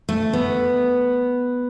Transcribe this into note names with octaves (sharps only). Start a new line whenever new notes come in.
A3
B3